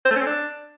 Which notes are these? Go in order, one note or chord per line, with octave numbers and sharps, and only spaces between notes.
C5
A3
C#4
C4
D4